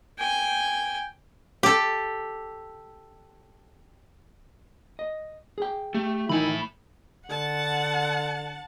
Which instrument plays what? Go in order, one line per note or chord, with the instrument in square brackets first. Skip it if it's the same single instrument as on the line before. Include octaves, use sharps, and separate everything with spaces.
[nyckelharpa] G5 G#5
[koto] G4 A4
[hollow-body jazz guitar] D#5
G#4 G5
[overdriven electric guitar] A3 [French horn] G4
[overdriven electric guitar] A2 B5 [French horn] D#3 [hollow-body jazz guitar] E3 D#4 G#5 [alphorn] E4
[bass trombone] D3 [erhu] F#5 [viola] A5